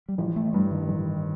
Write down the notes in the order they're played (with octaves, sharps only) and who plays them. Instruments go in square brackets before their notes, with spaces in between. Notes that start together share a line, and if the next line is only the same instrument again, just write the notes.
[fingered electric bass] G3
[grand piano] A1 [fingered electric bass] F3
[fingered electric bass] A3
[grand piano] G2 [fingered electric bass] G3
[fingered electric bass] D#3
[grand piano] A1